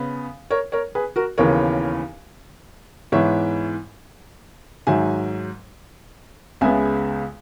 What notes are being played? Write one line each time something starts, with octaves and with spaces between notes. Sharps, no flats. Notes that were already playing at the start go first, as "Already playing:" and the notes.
Already playing: C#3 B3
A#4 C#5
A#4 C#5
G#4 B4
F#4 A#4
D#2 C#3 E3 B3 A#4 C#5
G#2 E3 B3 C#5 E5
G#2 D#3 F#3 E5 G#5
C#2 C#3 G#3 B3 E5 G#5